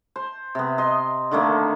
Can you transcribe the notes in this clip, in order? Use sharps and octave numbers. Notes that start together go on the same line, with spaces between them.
C5
C3 B3
D#5 C6
D3 D#3 A3 A#3